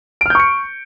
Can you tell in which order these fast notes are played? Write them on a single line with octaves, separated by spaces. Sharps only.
D7 F6 G6 C#6 C#7